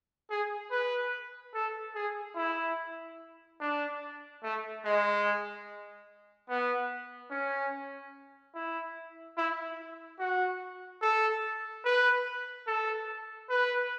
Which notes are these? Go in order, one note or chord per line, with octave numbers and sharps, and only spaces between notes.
G#4
B4
A4
G#4
E4
D4
A3
G#3
B3
C#4
E4
E4
F#4
A4
B4
A4
B4